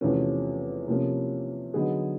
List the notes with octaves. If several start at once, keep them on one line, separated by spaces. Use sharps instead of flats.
E2 C3 F3 A3 C#4
C3 F3 A#3 C#4
D3 F#3 B3 D#4 G#4